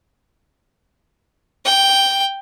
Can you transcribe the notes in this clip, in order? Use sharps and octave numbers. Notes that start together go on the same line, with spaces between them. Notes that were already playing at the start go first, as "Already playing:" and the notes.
G5